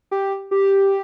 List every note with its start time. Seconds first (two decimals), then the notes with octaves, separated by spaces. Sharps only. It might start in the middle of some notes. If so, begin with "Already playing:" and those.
0.11 G4
0.51 G4